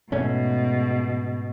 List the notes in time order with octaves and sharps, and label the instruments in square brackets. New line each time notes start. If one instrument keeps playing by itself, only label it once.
[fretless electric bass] G#2 A3 C#4 [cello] B2